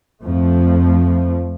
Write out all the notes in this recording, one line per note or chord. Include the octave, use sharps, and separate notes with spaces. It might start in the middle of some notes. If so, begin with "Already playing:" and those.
F2 F3 A3